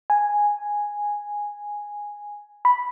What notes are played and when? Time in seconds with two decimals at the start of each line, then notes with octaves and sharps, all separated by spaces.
0.10 G#5
2.65 B5